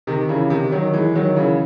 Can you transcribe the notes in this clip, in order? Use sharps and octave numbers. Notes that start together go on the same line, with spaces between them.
C3 D#3
C#3 E3
C3 D#3
D#3 F#3
E3 G#3
D#3 F#3
C#3 E3